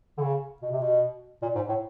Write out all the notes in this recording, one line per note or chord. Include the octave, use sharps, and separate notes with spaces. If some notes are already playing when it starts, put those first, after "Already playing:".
D3
C#3
B2
C3
B2
A#2
G#2
A2